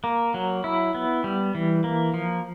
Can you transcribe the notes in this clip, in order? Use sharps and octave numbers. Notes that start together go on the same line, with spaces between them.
A#3
F#3
E4
B3
G3
E3
A#3
F3